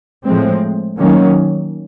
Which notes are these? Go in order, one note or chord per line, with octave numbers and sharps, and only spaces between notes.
A2 F3 G#3 C4
D#3 F#3 A#3 C#4